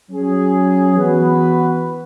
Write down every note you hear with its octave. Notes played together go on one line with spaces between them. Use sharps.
F#3 C#4 G#4
E3 B3 F#4 B4